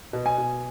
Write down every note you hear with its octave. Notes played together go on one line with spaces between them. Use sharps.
B2
G#5
B2